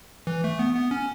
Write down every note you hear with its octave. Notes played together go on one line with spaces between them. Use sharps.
E3
A3
B3
B3
C#4